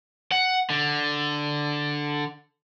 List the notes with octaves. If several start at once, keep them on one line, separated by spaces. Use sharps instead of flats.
F#5
D3